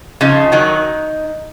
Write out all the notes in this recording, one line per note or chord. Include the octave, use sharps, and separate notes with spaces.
C#3 F3 D#4
D#3 F#3 D#4